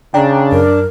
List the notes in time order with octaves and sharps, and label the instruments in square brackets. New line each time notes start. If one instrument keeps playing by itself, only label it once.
[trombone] C#3 [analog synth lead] D4 [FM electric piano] G5 A#5
[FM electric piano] F#2 [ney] A#4